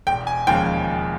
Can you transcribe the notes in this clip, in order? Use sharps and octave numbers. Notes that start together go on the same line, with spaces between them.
E1 G5
G#5
D#2 C#3 F3 G#3 G5